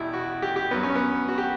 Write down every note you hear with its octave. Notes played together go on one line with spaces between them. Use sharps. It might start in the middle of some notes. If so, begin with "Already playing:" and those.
Already playing: E2 B2 G3 E4
F#4
G4
G4
G2 F#3 B3
C#4
B3
F#4
G4